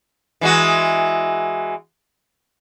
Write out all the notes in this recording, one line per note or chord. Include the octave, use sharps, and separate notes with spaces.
E3 G#3 F#4